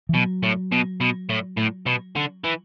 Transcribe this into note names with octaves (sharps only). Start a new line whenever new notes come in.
E3
B2 F#3
A2
B2
B2
A2
A2
B2
D3
E3